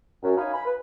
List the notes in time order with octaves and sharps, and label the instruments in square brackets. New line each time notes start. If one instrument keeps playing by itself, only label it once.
[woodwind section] F#2
D#4 C#5 F5 G#5 B5
G#5 B5
B4